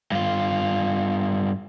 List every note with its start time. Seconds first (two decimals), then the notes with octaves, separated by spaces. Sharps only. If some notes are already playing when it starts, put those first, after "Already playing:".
0.12 G2 F4